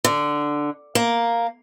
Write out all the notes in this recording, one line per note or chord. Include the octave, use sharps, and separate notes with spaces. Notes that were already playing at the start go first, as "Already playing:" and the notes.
D3
A#3